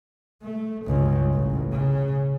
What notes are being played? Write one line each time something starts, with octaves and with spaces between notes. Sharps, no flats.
A3
C#2 G2
A1
C#3